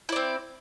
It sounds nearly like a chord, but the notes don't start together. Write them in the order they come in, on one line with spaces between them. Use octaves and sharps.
E4 D5 C4